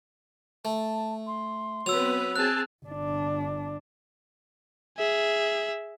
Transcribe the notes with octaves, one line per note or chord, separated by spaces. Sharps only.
A3 A5
C6
F#3 B3 C4 B4 E6 F7
C4 G#4 A5 F#6
G1 D4
G#4 E5